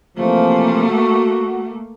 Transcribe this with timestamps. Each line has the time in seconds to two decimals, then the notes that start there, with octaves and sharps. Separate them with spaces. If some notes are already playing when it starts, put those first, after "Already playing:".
0.18 C3 E3 F3 A3 A#3
0.87 F#4